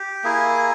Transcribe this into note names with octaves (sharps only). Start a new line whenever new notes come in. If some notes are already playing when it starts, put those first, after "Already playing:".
Already playing: G4
A#3 E4 G#4